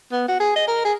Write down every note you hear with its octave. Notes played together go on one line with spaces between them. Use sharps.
B3
F#4
G#4
D#5
A#4
G#4